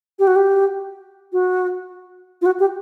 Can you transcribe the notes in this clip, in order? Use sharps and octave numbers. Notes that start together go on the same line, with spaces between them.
G4
F#4
G4
F#4
F4
F#4
G4